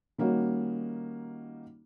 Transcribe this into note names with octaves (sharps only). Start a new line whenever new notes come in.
D#3 G3 A#3 C#4 D#4 F#4